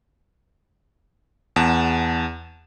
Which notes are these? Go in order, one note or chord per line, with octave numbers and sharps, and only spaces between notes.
E2 F#5 A5 E7